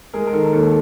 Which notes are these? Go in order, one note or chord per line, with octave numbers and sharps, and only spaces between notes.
G#3 G#4 A#4
A#4
D#3 A4
A#4
D#2 A4